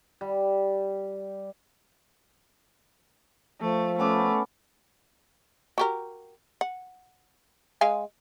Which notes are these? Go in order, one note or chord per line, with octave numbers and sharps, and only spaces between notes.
G3
F3 A3
A3 B3 C#4 D6
F#4 G4 A#4
F#5
G#3 F5 G#5